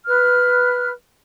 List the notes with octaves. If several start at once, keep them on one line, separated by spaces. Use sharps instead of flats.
B4 F6